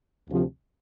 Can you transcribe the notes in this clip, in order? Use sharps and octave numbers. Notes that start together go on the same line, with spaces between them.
D2 C3 F3